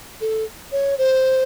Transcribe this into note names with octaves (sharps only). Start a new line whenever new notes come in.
A4
C#5
C5